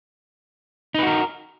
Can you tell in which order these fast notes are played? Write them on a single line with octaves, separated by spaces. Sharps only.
D#4 B4 F#4 A#4